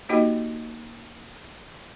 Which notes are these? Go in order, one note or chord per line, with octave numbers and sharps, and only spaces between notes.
A#3 D#4 F#4 G4 D#5 G5